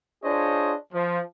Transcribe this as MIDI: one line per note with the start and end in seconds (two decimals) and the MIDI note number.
0.24 0.74 62
0.24 0.74 65
0.24 0.74 68
0.24 0.74 72
0.24 0.74 73
0.24 0.74 75
0.94 1.19 53